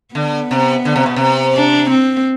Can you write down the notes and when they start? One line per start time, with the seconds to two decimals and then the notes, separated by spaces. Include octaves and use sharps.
0.15 D3 B3
0.51 C3
0.85 D3
0.96 C3
1.06 B2
1.16 C3
1.55 D4
1.90 C4